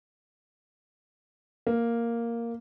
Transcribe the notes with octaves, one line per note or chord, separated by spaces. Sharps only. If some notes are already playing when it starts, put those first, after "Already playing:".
A#3